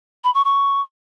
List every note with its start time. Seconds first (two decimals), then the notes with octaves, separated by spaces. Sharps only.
0.24 B5
0.34 C#6
0.44 C#6